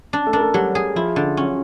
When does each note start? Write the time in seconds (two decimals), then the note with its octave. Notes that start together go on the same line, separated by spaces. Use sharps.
0.13 D4
0.27 A3 A4
0.33 D4 A#4
0.41 A3 A4
0.54 F#3 G3 G4
0.75 G#4
0.96 F3 E4 F4
1.16 D3
1.37 F#3 C#4 F#4